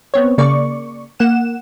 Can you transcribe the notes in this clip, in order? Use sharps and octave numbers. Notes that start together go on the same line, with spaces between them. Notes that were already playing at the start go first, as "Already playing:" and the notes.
B3 C4 C#5
C#3 A#3 D5 C#6
A#3 F#5 E7